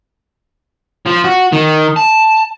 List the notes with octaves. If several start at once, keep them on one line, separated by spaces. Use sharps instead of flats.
F3
F#4
D#3
A5